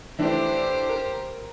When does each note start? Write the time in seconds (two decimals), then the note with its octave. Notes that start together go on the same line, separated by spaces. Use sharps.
0.19 E3 A3 D4 G4 C5
0.89 A#4